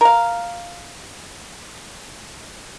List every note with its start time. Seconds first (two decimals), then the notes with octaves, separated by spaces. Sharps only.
0.01 A#4 F5